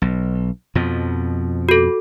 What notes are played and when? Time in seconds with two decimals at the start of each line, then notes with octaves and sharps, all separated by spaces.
0.02 B1
0.75 F2 B2 F3
1.69 F#4 A4